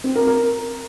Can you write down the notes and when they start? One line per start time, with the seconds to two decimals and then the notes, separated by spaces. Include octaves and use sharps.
0.04 C4
0.15 A#4
0.27 A#4